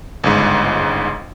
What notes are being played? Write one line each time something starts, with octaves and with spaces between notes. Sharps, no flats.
G1 C#2 G#2